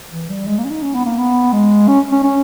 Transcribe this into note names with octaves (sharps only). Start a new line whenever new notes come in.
E3
G3
G#3
A#3
C#4
D#4
C#4
B3
A#3
B3
G#3
C#4
C#4
C#4